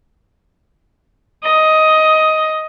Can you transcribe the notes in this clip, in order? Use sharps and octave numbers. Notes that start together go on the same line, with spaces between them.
D#5